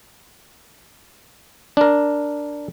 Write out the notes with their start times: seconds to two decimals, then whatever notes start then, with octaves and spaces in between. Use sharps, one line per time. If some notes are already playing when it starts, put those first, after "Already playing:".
1.77 D4 A#4